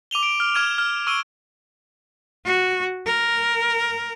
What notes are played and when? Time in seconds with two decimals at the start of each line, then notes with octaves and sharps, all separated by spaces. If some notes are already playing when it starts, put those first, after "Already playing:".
0.11 D6 D#7 F7 G7
0.23 D7
0.40 F6
0.55 D6 F6 G#6 D#7 E7
0.78 F6
1.07 C#6 E6 F6 D7 D#7 G7
2.45 F#4
3.06 A#4